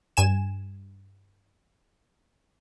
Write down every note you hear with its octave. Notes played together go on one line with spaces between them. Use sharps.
G2 G#5 E7